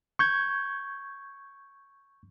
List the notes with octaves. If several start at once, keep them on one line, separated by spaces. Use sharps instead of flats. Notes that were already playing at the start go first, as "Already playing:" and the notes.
C#6 G6 G#6